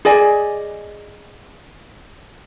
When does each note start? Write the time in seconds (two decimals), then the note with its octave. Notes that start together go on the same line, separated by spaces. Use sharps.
0.05 G#4 D5 D#5 G#5